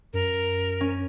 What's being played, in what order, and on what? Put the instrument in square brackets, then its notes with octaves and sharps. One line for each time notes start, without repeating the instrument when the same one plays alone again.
[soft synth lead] F#2 [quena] A#4
[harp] C#4